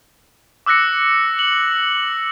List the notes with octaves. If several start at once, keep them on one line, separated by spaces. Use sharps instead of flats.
D6 E6 F#6 A#6 C#7
F#7